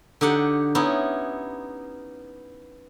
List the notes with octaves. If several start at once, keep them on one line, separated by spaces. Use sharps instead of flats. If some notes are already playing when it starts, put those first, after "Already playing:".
D3 D#4 G4 F#5
B3 C#4 D#4 E4